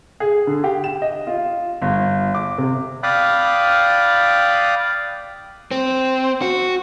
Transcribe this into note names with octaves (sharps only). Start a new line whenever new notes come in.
G#4
D3
G4
E7
D#5
F4
G1
D6
C3
D5 F5 G5 B5 D#6 F#6
C4
F#4